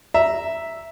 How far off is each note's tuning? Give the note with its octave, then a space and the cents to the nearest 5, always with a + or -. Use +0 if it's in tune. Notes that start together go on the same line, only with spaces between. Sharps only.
E5 +0 A#5 +0